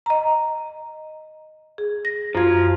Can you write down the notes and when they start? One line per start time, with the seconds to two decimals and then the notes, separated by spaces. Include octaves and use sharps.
0.06 D#5 A#5
1.78 G#4
2.05 A#6
2.35 F#2 F3 F4 G#6